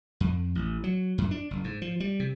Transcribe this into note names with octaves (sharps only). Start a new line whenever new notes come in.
F2
A1
F#3
F#2
D4
F#1
G#2
F3
G3
C3